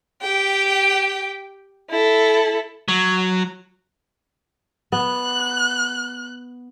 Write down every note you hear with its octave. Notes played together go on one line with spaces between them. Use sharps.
G4 G5
E4 A4
F#3
B3 F#6